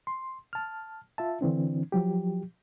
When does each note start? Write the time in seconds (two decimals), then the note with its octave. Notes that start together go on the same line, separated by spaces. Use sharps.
0.07 C6
0.53 A5 F6
1.18 F4 E5 A5
1.41 D3 E3 C4 D4
1.92 F3 F#3 G4